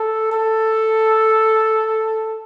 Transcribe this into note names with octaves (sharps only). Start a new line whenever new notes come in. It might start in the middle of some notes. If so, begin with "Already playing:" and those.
Already playing: A4
A4